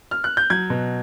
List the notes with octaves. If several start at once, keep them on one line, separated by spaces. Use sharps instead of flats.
F6
F#6
G6
F#3 G#6
B2